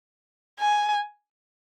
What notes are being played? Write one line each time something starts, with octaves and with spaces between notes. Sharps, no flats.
G#5